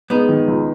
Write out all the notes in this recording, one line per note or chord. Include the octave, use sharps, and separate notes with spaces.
G#3 B3 D#4
D#3
C#2